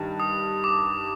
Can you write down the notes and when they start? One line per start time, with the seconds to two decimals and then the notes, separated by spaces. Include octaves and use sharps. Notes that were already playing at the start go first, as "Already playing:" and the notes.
Already playing: G2 D#3
0.20 D#6
0.64 D6